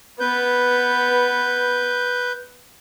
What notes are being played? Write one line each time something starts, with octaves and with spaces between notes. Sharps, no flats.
B3 B4 G6